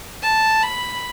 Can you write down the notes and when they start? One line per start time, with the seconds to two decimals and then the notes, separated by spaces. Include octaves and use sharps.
0.23 A5
0.63 B5